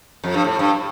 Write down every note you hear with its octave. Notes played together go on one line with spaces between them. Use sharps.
F2
G2
A2
G2